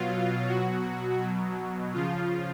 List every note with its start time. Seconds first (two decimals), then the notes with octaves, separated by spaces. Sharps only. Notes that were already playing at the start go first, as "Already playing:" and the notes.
Already playing: B2 F#3 F4
0.47 B2 F#3 F#4
1.21 B2 F#3
1.93 C#3 F3 F4